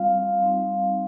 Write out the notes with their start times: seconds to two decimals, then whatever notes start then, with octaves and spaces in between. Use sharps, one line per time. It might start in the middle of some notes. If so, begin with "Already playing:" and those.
Already playing: G3 C4 F4 F5
0.42 G3 C4 D#4